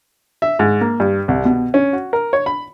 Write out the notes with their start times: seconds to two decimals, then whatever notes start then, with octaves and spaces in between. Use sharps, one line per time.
0.42 E5
0.59 G#2
0.81 A#3
1.00 G2
1.28 C2
1.45 B2
1.74 C#4
1.93 F#4
2.13 A#4
2.33 C#5
2.46 B5